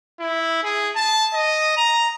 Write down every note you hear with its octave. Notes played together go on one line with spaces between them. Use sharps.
E4
G#4
A5
D#5
A#5